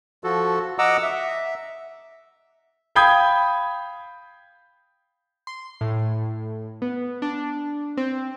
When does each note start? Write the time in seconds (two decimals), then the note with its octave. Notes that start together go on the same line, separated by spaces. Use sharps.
0.24 F3 F#4 A4
0.79 D#5 F#5 A#5 D6 E6
1.03 E5
2.95 F5 G5 B5 D#6 G6 G#6
5.47 C6
5.81 A2
6.82 B3
7.22 D4
7.97 C4